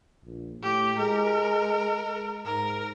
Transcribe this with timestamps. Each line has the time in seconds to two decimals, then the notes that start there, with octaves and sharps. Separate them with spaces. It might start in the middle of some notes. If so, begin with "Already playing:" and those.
0.25 A#1
0.63 A2 G4
0.99 G#3 A#4
2.45 G#2 A#4